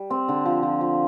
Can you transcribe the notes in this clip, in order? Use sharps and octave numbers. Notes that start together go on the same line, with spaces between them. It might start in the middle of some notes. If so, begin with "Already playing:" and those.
Already playing: G3
C4
D3
F3
F3
F3